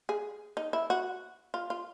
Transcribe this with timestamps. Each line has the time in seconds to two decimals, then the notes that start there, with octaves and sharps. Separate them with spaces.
0.09 G#4
0.57 D#4
0.73 E4
0.90 F#4
1.54 F4
1.70 F4